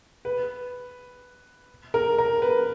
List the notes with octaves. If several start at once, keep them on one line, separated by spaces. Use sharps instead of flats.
B4
A#4
A#4
B4